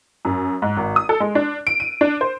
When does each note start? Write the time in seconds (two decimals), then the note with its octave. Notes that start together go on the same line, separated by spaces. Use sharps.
0.25 F#2
0.62 G#2
0.77 G#1
0.96 D#6
1.09 A4
1.20 G#3
1.35 D4
1.67 D7
1.80 D#7
2.01 D4
2.21 C5